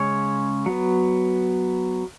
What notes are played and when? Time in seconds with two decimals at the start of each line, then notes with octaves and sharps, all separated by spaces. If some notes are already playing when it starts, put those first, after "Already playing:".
Already playing: C#3 G#3 C#4 C#5
0.66 F#3 B3